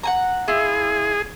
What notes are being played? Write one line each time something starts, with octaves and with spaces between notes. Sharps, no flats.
F#5 G#5 A#5
E4 F4 G#4